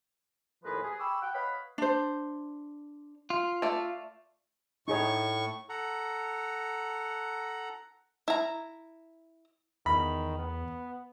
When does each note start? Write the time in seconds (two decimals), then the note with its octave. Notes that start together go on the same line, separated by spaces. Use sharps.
0.64 D#2 A2 F3 G#4 A#4 B4
0.82 G#4
1.00 G5 B5 C#6 D6 E6
1.22 F#5 G5
1.34 B4 C#5 D#5 F5 F#5 B5
1.78 D4 C5
3.30 F4
3.62 A3 D5
4.88 A2 D#4 G#4 C#5 C#6
5.69 A4 F#5 A#5
8.28 E4 A#5
9.86 E2 D#3 B5
10.39 B3